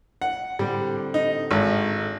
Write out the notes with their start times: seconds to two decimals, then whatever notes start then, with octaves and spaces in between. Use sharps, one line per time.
0.22 F#5
0.59 A2 D3 G3 C4
1.14 D#4
1.51 G#1